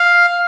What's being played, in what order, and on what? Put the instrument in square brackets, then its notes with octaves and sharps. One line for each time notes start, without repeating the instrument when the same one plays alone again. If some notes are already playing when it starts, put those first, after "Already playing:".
Already playing: [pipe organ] F5